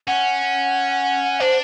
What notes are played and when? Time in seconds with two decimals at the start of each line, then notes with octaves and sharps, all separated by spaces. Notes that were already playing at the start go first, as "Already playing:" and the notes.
0.07 C#4 F#5
1.40 D4 C5